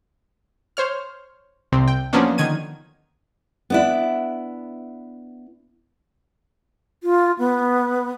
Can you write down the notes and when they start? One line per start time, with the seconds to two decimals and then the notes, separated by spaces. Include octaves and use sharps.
0.77 C5 C#5 F6
1.72 C2 C3 C4
1.88 G5
2.13 F3 F#3 A#3 B3 C#4 D4
2.38 D3 D#3 G#6 D#7
3.70 B3 D4 E4
7.02 F4
7.38 B3